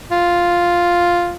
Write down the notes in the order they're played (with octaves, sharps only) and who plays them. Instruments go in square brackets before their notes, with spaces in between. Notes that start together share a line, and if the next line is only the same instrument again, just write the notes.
[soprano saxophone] F4